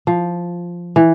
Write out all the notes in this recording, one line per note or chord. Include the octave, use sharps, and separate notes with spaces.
F3
E3